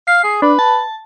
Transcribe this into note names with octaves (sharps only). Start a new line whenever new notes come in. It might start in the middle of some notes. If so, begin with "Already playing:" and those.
F5 C7
G#4
D4 B4
A5